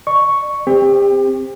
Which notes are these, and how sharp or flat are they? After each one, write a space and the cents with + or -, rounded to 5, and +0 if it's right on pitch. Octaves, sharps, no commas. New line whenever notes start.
D5 +40 C#6 +0
C4 +0 G4 +30